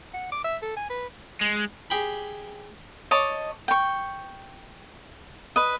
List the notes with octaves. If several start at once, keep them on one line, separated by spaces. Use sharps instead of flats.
F#5
D6
E5
A4
G#5
B4
G#3
G4 G#4 G5 G#5 B5
C#5 D#5 A5 D6
G5 C#6
B4 D#5